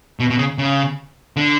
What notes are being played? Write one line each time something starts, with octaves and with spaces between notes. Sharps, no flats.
B2
B2
C#3
C#3
D3